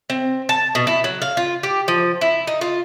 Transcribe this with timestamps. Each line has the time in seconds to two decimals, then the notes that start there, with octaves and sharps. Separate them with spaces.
0.10 C4
0.49 A5
0.75 B2
0.87 E4
1.04 F#3
1.22 F5
1.37 F4
1.63 G4
1.88 F3
2.21 E4
2.47 D#4
2.61 F4